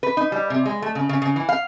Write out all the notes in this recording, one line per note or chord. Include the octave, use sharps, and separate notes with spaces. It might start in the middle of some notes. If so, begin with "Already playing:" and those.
B4
D#4
G3
C3
G#3
A3
C#3
C#3
C#3
E3
F5